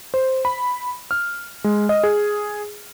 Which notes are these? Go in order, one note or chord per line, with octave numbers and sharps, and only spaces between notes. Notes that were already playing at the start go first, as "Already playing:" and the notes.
C5
B5
F6
G#3
D#5
G#4